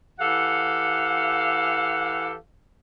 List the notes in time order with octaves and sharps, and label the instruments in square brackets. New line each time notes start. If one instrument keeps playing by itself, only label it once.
[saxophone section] E3 G4 A4 F5 F#5